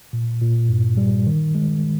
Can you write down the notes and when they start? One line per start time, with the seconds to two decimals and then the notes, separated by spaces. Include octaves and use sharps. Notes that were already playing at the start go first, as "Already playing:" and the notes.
0.13 A#2
0.41 A#2
0.69 G2
0.97 G3
1.27 D#3
1.55 G#3